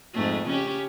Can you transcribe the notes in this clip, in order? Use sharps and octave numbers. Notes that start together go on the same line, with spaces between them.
F2 G#2 A3
C#3 C#4 G4